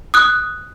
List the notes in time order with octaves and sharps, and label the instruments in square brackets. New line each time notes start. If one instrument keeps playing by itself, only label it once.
[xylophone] D#6 F#6